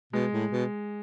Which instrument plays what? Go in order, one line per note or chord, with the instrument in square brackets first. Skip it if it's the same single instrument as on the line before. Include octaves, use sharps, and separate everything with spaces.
[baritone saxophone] B2 [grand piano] G#3
[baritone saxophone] A2
B2